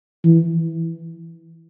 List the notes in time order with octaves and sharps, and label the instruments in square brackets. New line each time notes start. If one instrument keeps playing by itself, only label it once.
[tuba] E3